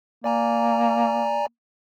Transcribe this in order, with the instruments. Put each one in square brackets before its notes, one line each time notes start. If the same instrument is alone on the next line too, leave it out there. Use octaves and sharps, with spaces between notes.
[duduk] A#3 [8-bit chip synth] D5 G#5 A#5